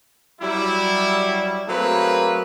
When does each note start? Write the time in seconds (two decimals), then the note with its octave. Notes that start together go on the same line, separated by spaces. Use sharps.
0.41 F#3 G3 E4
1.68 F#3 A3 A#3 C4 G#4 B4